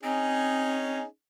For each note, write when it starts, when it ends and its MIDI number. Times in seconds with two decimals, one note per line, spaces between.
0.03 1.00 60
0.03 1.04 61
0.03 1.04 63
0.03 1.04 68